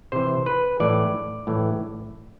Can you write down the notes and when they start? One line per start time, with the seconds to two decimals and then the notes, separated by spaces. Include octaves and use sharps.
0.12 C3 E3 C5
0.46 B4
0.80 A2 E3 D5
1.47 A2 E3